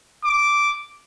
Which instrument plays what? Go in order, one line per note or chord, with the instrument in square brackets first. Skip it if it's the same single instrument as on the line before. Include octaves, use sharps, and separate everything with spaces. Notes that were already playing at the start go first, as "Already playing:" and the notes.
[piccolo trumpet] D6